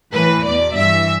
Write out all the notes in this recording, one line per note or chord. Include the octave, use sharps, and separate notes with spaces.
A2 E3 B4
E2 B2 D5
G2 E3 E5